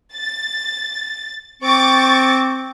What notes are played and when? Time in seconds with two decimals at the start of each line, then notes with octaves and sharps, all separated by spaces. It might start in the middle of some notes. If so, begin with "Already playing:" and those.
0.13 A6
1.62 C4 C#6 D6 A6